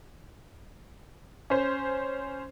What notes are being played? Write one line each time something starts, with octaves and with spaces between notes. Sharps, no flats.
C#4 C5